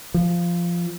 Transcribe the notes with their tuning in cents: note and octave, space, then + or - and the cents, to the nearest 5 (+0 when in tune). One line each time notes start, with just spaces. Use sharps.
F3 -10